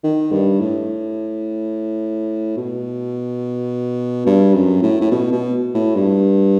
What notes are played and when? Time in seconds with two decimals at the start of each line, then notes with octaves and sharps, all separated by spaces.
0.04 D#3
0.32 G2
0.60 A2
2.57 B2
4.26 G2
4.54 F#2
4.83 A2
5.01 A2
5.11 B2
5.32 B2
5.74 A2
5.95 G2